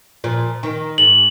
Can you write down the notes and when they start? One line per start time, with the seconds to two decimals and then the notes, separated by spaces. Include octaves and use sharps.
0.24 A#2 F3
0.63 D#3
0.98 G#2 F#7